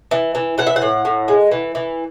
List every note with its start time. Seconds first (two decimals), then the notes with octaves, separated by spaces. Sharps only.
0.11 E3
0.35 E3
0.58 E3 F#5
0.67 E5
0.76 F#5
0.82 A2
1.05 A2
1.28 G#3
1.51 E3
1.75 E3